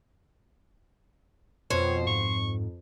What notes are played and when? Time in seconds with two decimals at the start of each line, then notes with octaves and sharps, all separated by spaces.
1.70 F2 B2 C5 C#5
2.07 F2 G#2 C#6